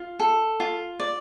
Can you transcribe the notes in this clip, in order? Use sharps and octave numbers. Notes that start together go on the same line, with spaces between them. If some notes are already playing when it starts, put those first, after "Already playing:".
Already playing: F4
A4
F4
D5